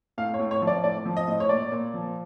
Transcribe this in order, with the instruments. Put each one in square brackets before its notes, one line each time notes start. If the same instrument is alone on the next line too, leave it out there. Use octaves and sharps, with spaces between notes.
[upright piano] A2 F5
C#5
A2
C#5
F3
D5
A2 D5
F3
D#5
A2
C#5
A#2 D5
A#2
F3